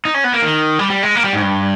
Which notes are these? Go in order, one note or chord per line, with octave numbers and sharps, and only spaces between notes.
D#4
C#4
B3
A#3
D#3
G3
G3
G#3
A#3
G3
G#2
G2